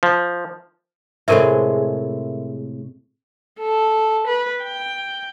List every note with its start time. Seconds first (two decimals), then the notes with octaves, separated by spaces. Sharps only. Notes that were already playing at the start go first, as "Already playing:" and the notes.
0.03 F3
1.28 A2 C3 G#3 A4 A#4 E5
3.60 A4
4.27 B4
4.63 G5